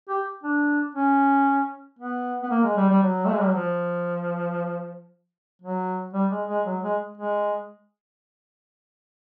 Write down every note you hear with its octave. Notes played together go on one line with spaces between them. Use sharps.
G4
D4
C#4
B3
B3
A#3
G#3
G3
G3
F#3
A3
G#3
G3
F#3
F3
F#3
G3
G#3
G#3
F#3
G#3
G#3